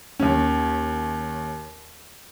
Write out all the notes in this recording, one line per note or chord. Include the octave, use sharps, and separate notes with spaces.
D#2 C#4